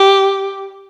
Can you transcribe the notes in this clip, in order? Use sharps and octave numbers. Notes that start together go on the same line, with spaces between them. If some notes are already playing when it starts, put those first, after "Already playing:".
Already playing: G4